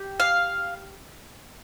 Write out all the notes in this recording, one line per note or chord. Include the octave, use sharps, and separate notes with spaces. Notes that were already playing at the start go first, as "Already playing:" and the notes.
Already playing: G4
F5